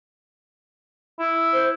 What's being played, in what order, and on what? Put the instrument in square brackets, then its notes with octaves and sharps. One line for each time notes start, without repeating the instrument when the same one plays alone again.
[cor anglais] E4
[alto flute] C5